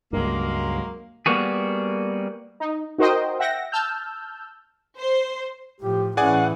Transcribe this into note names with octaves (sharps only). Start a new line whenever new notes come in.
C#2 G2 F#3 G#3 A#3
G3 A#3 B3 F#4 G#4
D#4
D#4 F#4 A#4 C5 D#5 G5
E5 F#5 G5 A#6
A5 E6 F6 G6
C5
A2 F3 G4
A2 E3 C#4 G#4 D5 F#5 G#5